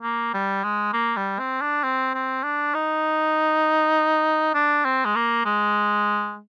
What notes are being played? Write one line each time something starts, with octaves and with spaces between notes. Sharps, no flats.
A#3
G3
G#3
A#3
G3
C4
D4
C4
C4
D4
D#4
D4
C4
G#3
A#3
G#3